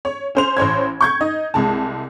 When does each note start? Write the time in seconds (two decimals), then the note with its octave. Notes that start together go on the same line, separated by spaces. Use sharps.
0.05 C#5
0.35 C#4 C5 F7
0.57 A1 C5 C#5 G#6
1.01 C#6 G6 G#6
1.21 D#4 D#5
1.54 C2 G#3 A5